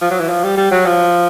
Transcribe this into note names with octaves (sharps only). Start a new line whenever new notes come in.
F3
F#3
E3
F3
G3
G3
F#3
F3